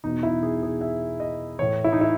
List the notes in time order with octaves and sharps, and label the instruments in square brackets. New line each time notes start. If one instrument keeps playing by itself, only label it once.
[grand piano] E2 B2 D#4
E4
G#4
G#4
E5
D#5
A2 E3 C#5
E4
D#4
E4